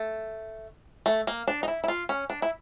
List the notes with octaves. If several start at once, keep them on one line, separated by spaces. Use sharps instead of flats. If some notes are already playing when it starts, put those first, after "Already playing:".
Already playing: A3
A3
A#3
D4
D#4
E4
E4
F4
C#4
D4
E4